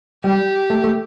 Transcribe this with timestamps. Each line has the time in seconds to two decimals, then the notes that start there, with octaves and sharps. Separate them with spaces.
0.24 G3 G4
0.70 A3
0.84 A3